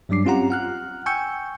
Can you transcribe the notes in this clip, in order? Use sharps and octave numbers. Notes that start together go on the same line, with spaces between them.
G2 F#3 G3 D4 D6 C7
C4 C#4 F4 G4 F#5 A#5
F#5 F6 F#6
G5 G#5 C#6 E6 G6 C#7